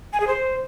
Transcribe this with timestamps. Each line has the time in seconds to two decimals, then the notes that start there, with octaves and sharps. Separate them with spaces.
0.13 G#5
0.20 G#4
0.27 C5